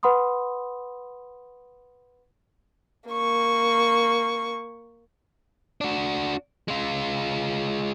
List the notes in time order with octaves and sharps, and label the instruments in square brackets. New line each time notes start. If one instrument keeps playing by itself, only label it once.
[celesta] B4 F#5 B5 C6 D#6
[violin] A#3 C#6
[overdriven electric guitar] D4 F#4
G#3 F4